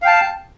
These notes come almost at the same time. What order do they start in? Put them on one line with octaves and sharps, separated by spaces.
F5 G5 A5